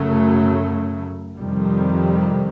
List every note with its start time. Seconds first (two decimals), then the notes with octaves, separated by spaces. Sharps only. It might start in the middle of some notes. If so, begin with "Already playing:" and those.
Already playing: F#2 C#3 F#3 A3
1.36 F2 C3 D#3 G3